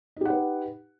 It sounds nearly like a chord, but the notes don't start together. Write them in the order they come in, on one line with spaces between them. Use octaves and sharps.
D#4 G4 F#5 B4